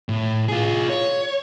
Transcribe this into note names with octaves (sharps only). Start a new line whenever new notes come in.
A2
F4 G#4
C#5